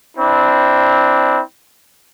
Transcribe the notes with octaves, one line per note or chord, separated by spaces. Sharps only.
C4 D4 E4